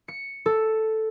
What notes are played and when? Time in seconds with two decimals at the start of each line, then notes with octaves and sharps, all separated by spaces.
0.08 C#7
0.46 A4